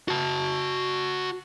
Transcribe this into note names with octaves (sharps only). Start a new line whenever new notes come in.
F#4 A5